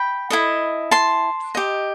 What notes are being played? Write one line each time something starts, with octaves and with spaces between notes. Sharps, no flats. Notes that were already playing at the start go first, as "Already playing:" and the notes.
Already playing: G5 B5
E4 A4 D#5
A5 C6
G4 D#5